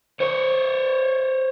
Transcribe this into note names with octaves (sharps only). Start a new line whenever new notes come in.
C5 C#5